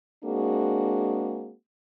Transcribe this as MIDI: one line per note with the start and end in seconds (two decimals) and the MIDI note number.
0.24 1.52 56
0.24 1.52 58
0.24 1.52 60
0.24 1.52 62
0.24 1.52 66
0.24 1.52 68